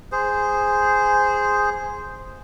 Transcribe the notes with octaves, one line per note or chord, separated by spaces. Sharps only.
G#4 C5